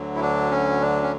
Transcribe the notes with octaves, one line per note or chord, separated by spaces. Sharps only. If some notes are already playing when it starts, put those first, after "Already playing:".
Already playing: D2 D3 F#3
E4
D4
C#4
D4
C#4